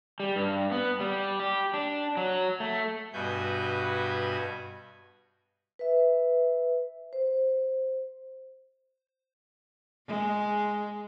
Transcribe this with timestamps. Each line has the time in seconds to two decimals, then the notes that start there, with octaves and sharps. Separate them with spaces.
0.20 G3
0.36 G2
0.72 B3
1.01 G3
1.39 G4
1.74 D4
2.17 F#3
2.60 A3
3.13 G2 B2 F#4 B4 G#5 G6
5.79 B4 E5
7.13 C5
10.08 G#3